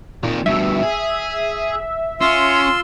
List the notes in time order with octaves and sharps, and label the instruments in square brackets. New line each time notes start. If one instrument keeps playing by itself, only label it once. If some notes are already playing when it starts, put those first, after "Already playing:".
[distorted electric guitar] F2 D#3 [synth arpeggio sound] A#2
[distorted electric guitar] G2 B2 [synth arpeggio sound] E5
[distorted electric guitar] G#4
[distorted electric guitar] C#4 [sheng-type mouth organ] F4 C6 E6